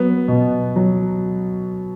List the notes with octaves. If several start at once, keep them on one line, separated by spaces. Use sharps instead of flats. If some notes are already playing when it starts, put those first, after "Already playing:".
Already playing: F#3 B3
B2
F#3